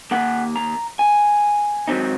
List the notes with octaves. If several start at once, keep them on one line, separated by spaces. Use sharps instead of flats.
D#2 D#3 A#3 F#5
A#5
G#5
G#2 D#3 F#3 C4 D#4